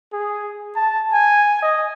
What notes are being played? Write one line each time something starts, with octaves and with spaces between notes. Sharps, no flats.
G#4
A5
G#5
D#5